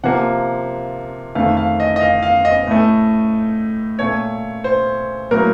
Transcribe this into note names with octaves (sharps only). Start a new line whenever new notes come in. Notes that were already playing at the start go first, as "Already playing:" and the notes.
C3 F3 A#3 F#5
F2 D#3 A3 F5
F5
D#5
D#5
F5
F5
D#5
A2 A3
A#2 A3 C#5
C5
A2 F#3 A#3 A#4